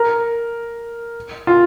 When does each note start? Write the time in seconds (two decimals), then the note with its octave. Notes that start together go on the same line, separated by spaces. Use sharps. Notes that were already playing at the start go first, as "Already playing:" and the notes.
Already playing: A#4
1.47 F4